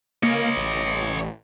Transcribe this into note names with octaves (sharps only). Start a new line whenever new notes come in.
A#3 C#5 D#5
A1